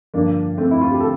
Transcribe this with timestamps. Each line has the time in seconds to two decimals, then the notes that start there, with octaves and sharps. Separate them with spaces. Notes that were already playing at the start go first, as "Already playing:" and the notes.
0.14 G2 D3 F3 A#3 D4
0.58 A3 C4
0.71 E4
0.81 F4
0.91 G4
1.00 D3 F4 A4